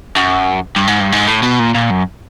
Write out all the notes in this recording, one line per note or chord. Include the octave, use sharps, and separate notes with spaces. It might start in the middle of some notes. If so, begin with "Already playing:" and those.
F#2
G2
G#2
G2
G#2
A2
B2
A#2
A#2
F#2